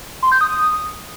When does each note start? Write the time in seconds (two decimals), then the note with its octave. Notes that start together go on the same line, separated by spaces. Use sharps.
0.23 C6
0.32 G6
0.41 D#6